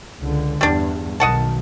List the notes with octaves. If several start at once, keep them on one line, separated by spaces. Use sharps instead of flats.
C#2 D3
E2 G2 G3 D4
B1 D#3 F#3 D#5 F#5 A5